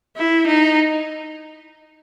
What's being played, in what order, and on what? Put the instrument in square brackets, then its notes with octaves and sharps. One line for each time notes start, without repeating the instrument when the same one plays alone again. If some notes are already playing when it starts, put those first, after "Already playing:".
[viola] E4
D#4